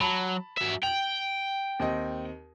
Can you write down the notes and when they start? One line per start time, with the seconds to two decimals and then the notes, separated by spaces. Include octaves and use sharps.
0.01 F#3 A5 B5
0.57 F#3 E5
0.83 G5 F7 F#7
1.80 D#2 C4 D#5